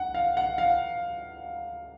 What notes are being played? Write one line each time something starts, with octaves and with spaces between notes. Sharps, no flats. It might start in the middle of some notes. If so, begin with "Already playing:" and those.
Already playing: D2 F#5
F5
F#5
F5